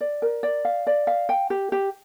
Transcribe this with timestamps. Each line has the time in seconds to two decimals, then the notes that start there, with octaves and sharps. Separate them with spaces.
0.01 D5
0.22 A#4
0.43 D5
0.65 F5
0.87 D5
1.07 F5
1.29 G5
1.50 G4
1.72 G4